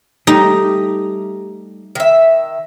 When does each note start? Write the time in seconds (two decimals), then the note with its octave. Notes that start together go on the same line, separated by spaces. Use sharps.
0.27 G3 A3 D#4 G4
1.95 D#3 E5